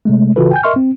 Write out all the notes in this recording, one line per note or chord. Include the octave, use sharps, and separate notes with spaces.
C3 G#3 A3
C#3 E3 F4 F#4 A4 B4
G5 G#5 G6
A#4 D#5 E5 C6 C#6 F6
C4